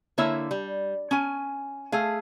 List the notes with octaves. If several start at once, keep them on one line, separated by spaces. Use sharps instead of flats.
D3 A#3 E4 C#5 E5
G3
C#4 G#5
A3 G#4 F5